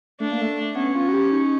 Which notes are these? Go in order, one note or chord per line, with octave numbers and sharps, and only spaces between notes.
A3 D4
A#3
A3
B3 C#4
F4
F#4
G4
D#4